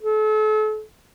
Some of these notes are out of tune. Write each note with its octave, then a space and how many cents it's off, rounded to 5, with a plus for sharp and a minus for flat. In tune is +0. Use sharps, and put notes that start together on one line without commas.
A4 -40